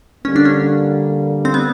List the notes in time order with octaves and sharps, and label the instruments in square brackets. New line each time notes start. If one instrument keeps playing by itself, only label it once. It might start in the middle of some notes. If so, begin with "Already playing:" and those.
[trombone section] D3 G3 A#3 [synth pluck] C#4
[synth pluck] D4
C#4
C4
B3